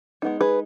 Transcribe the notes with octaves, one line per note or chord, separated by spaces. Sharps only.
G#3 B3 D#4
G#4 B4